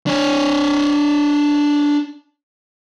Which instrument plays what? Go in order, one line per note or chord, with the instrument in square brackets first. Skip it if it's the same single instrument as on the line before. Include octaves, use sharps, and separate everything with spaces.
[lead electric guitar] D4 C#5